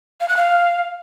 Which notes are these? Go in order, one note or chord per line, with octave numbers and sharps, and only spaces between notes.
F5
F#6
F5